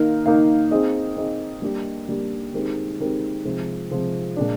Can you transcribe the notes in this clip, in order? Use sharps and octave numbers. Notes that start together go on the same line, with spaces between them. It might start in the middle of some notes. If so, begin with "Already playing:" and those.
Already playing: D#3 A#3 D#4 A#4 F5
D#3 A#3 D#4 A#4 F5
C4 D#4 G#4 D#5
C4 D#4 G#4 D#5
G3 A#3 D4 G4
G3 A#3 D4 G4
D#3 G#3 C4 G4 A#4
D#3 G#3 C4 G4 A#4
C3 F3 G#3
C3 F3 G#3
A#2 G#3 D4